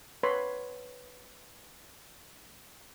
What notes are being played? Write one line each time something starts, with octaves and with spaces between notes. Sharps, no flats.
B4 C#5 B5 C6